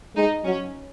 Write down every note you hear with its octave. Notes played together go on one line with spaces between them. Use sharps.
G#3 D#4
F#3 C#4